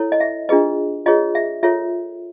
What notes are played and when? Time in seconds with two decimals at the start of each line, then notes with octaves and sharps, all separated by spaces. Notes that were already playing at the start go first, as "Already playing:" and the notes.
Already playing: E4 A4 C#5
0.12 D#5
0.20 E5
0.49 D4 F4 G#4 B4 D#5
1.06 F4 G#4 C#5 D#5
1.35 E5
1.63 F4 A4 C#5 E5